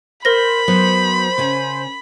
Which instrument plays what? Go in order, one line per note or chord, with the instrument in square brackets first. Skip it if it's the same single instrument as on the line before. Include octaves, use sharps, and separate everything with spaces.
[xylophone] A#4 A#6 [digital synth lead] C5 [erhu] B5
[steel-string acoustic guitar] F#3 B3 [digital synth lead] C5
[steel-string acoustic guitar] C#3 C#4 G#5